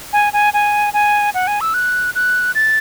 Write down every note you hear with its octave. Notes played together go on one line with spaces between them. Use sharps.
G#5
G#5
G#5
G#5
F#5
G#5
E6
F#6
F#6
A6